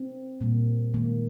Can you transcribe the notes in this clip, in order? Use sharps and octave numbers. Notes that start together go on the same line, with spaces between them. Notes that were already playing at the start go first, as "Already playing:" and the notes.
Already playing: C4
A#2 G3 A#3
D#3 G#3 A#3